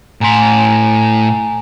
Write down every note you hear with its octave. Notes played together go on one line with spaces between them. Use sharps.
A2 G#5 A#5 C6